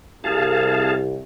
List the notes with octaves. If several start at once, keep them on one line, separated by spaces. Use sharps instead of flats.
C2 G#4 F5 A5